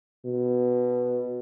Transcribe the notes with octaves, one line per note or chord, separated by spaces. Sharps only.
B2